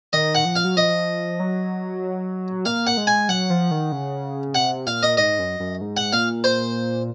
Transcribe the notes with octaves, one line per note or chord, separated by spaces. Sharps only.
D#3 D#5
F#5
F3
F5
F#3
F3 D#5
F#3
A#3 F5
F#5
G#3
G#5
F#3 F#5
F3
D#3
C#3
C3 F#5
A#2 F5
D#5
G#2 D#5
F#2
F#2
G#2
F#5
A#2 F5
C5